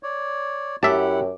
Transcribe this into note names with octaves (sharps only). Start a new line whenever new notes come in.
C#5 D5
F#2 E4 G4 E5 F#5 A5